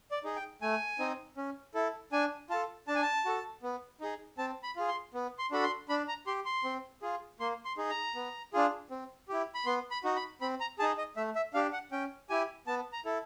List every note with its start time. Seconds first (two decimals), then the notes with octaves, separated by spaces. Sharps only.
0.11 D5
0.24 D#4 G#4
0.36 G5
0.62 A3 G#5
0.99 C4 D#4
1.37 C#4
1.74 E4 A4
2.12 D4 G#5
2.50 F4 A4 A5
2.88 D4 A5
2.95 G#5
3.02 A5
3.25 F#4 A4
3.63 B3
4.01 D#4 G#4
4.38 C4 A5
4.63 B5
4.76 F4 G#4
4.88 C6
5.14 B3
5.39 C6
5.51 D4 F#4 A4 B5
5.64 C6
5.89 D4 B5
6.08 A#5
6.27 G4 C6
6.45 C6
6.64 C4
7.02 F4 G#4
7.40 A#3 C6
7.65 C6
7.77 D#4 G#4
7.90 A#5
8.15 B3
8.53 D4 F4 G#4
8.91 C4
9.29 E4 G4
9.55 B5
9.66 B3 C6
9.91 B5
10.04 D#4 F#4
10.16 B5
10.41 C4 B5
10.61 A#5
10.79 G#4 A5
10.82 D#4
10.98 D#5
11.17 A3 E5
11.35 E5
11.54 D4 G4 F5
11.73 F#5
11.92 C#4 G5
12.29 E4 G4 G#5
12.67 B3 A5
12.93 A#5
13.05 E4 A4